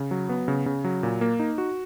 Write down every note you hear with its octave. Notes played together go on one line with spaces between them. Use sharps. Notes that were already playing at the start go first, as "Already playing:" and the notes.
Already playing: C#3
F#3
B3
C#3
C#3
F#3
A#2
A#3
D#4
F#4